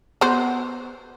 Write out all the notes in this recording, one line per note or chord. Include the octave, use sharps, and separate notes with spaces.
B3 F#4 C5